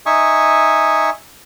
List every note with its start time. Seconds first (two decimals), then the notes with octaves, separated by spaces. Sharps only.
0.06 D#4 E5 G#5 C#6 D#6